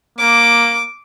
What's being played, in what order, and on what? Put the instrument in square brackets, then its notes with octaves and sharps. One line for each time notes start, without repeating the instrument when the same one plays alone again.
[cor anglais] A#3 [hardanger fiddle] D6